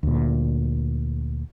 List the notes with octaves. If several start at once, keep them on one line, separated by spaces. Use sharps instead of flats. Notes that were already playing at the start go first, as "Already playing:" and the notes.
D2 A#2